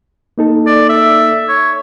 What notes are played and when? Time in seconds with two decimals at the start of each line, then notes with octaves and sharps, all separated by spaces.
0.38 A#3 D#4 A4
0.66 D5
0.89 E5
1.48 C#5